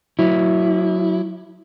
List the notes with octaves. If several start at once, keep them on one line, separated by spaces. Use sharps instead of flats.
F#3 E4